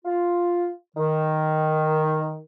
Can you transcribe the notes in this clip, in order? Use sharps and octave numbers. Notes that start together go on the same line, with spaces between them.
F4
D#3